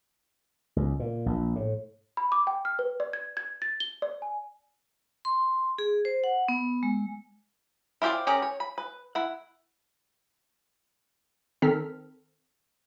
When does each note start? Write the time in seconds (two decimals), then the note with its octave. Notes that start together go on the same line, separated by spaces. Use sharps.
0.76 C#2
1.00 A#2
1.26 A#1
1.56 A2
2.17 B5
2.32 D6
2.47 G5
2.65 F6
2.79 B4
3.00 D5
3.13 G#6
3.37 G#6
3.62 A6
3.80 G7
4.02 D5
4.22 G#5
5.25 C6
5.78 G#4
6.05 C5
6.24 F#5
6.48 B3
6.83 G#3
8.02 E4 F4 G4 C5 D5
8.27 C#4 G4 G#4 A#4
8.42 C#5
8.60 B5
8.78 B4
9.15 E4 F#5
11.62 D#3 C4 A4 A#4 F6 B6